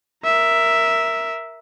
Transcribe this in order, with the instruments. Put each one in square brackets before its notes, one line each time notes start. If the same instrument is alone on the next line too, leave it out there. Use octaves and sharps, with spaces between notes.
[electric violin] A#4 E5